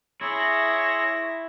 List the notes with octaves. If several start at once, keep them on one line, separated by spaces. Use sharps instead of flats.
E4 G#4 C#5 E5 C6 A#6